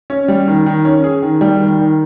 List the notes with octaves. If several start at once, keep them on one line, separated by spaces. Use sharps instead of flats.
C#4
G3
D#3
D#3
C#4
G#4
D#3
G3
D#3
D#3